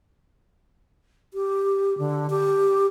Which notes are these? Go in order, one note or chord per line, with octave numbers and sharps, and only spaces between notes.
G4
D3
G4